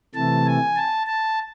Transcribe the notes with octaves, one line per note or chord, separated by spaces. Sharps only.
C3 E3 A3 A5
G#5
A5
A5